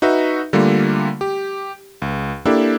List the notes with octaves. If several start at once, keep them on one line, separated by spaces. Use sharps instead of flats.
D#4 F#4 B4 E5
D3 G3 A3 A#3 F4
G4
C#2
A#3 D4 E4 G4 A4